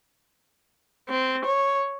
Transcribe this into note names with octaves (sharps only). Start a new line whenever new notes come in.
C4
C#5